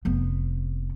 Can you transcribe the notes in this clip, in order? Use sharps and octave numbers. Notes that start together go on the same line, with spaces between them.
F1 B3